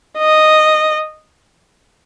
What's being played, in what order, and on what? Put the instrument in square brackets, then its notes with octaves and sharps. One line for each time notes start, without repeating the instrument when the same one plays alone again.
[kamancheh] D#5